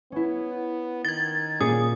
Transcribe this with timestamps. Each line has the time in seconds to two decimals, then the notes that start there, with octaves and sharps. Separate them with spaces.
0.12 B3 C#4 E4
1.05 D#3 G#6 A6
1.61 A#2 A#3 C#4 G#4 D#6